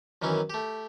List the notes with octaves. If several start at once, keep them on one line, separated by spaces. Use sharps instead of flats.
F#2 D#3 E3 C#4 E4
A3 G4